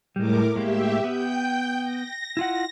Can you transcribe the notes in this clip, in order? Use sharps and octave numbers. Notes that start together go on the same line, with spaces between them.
A2 G3 G#3 A#4 D6
A2 G#3 A#3 G4 E5
B3 G5 G6
A#6
E4 F4 F#5